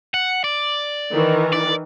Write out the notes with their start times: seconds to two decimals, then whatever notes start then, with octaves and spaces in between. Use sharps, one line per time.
0.14 F#5
0.44 D5
1.11 D#3 E3
1.53 D5